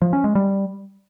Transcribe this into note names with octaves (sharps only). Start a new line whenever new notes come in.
F3
C#4
G#3
G3